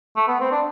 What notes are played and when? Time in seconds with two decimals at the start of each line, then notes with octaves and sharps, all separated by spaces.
0.17 A3
0.28 B3
0.40 C4
0.52 D4